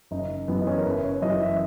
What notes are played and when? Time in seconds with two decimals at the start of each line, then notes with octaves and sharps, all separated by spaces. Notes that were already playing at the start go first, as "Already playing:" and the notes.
0.11 F#1 D#4
0.48 F#2 E3 B3
0.61 D#4
0.67 C#4
0.77 A#4
0.85 F#1 B4
1.03 C#5
1.22 F#2 E3 D#5
1.41 E5